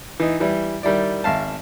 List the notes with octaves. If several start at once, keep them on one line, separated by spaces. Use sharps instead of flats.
E3 D#4
E3 G3 E4
D#3 G3 E4 D5
G#1 E5 F5 A5